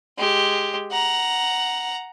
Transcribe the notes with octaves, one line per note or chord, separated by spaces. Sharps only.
G#3 G4
F#5 A#5